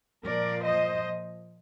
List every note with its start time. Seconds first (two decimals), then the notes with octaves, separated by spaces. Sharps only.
0.25 A#2 F3 A#4 D5
0.65 C5 D#5